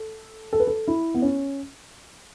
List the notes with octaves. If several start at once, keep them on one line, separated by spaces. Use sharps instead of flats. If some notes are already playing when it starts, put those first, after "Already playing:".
Already playing: A4
A4
B4
A4
E4
B3
C#4